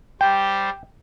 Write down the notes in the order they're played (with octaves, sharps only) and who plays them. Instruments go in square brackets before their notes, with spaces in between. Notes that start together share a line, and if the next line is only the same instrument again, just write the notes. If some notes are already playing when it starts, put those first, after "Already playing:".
[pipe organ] G3 G4 C5 [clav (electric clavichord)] G5